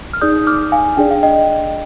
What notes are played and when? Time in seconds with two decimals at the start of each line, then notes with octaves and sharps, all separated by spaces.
0.13 F6
0.21 D#4 G#4 D5 D#6 G6
0.47 D6 F6
0.72 F5 G#5
0.97 D4 G#4 D5 G5
1.10 F5
1.23 D#5 G5